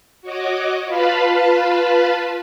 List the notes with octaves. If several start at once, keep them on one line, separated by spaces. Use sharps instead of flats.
F#4 C#5 D#5 D6
F4 B4 F5 A5 B5